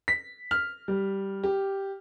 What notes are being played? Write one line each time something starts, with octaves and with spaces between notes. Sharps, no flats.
B6
F6
G3
G4